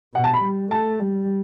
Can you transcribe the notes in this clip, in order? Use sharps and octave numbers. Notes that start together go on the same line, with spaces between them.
B2 F#5
A5
B5
G3
A3 A5
G3